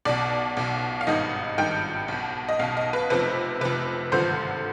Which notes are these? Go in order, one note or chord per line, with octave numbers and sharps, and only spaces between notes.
B1 B2 D5
B1 B2
F5
G#1 G2 D#3 D#5
G#1 G2 D#3 G5
B1 B2
D#5
B1 B2 F5
D#5
B4
F1 F2 C3 B4
F1 F2 C3 B4
G#1 G2 D3 F3 C5